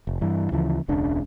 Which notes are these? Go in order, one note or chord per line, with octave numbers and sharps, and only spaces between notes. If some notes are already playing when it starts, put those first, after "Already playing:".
F1
G2 E3
D2 C#3 E3 F3
E1 C#2 C#3 D4